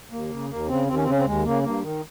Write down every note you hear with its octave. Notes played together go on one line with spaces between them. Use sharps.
D#2 A#3
C#3
D#2 A#3
C#3 C4
D#2 C4
C#4
C4
C#3 C#4
C4
D#2 G#3
C#3 A#3
G2 A#3
D#3